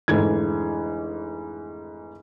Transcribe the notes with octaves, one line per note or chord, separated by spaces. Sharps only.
F1 G#2 D3 E3 G#6